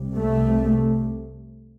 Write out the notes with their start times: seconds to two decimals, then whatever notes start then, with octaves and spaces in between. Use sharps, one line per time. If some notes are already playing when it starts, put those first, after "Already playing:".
Already playing: C2 C3
0.16 A3